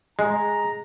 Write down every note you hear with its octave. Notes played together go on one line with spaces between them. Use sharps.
G#3 A#5